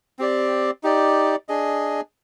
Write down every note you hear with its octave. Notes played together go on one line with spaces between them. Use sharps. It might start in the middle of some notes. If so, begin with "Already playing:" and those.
C4 G4 D5
D#4 G4 D5
D4 G#4 D#5